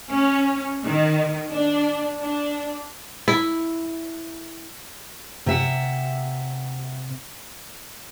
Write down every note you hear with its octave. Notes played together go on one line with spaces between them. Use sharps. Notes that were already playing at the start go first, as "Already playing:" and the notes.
C#4
D#3
D4
D4
E4
C3 E5 F#5